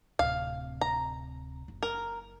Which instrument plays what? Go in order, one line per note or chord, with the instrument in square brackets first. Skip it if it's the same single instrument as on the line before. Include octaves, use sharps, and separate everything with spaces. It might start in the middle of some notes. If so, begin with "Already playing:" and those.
[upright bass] D1 C3 [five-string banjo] F5
[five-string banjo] A#5
[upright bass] F#1
[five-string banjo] A#4